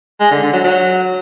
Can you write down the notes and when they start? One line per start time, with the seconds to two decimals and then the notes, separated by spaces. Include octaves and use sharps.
0.20 G#3
0.31 D3
0.42 D3
0.53 F#3
0.64 F#3